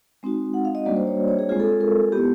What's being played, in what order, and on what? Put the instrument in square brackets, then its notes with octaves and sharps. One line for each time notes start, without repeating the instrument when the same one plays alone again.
[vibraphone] G#3 C4 D#4 F#4
F#5
F5
D#5
G3 A#3 D4 F#4 D5
C5
C#5
C#5
G#4
G#3 C4 F4 G#4
A4
A#4
B3 E4 G4